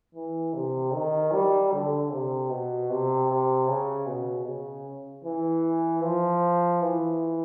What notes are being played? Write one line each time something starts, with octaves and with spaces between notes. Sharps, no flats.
E3
C3
D#3
G3
D3
C3
B2
C3
C3
C#3
B2
C#3
E3
F3
E3